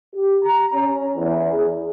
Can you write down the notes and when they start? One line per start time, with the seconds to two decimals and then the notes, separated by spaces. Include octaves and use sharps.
0.14 G4
0.43 A#5
0.73 C#4
1.16 E2
1.52 G#4